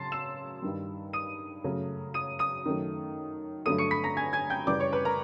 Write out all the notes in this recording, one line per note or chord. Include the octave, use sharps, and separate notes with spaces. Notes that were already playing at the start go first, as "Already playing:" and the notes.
Already playing: C#3 F#3 A5 C6 A6 C7
E6 E7
G2 D#3 G3
D#6 D#7
F#2 C#3 F#3 A3
D#6 D#7
D#6 D#7
F#2 D#3 F#3 A3
G2 D3 F#3 A3 D#6 D#7
C#6 C#7
B5 B6
A#5 A#6
G#5 G#6
G#5 G#6
G5 G6
F#2 C#3 E3 G3 D5 D6
C#5 C#6
B4 B5
A#4 A#5